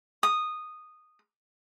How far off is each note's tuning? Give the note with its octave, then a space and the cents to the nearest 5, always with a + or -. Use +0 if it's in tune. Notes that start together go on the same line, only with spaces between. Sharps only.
D#6 -10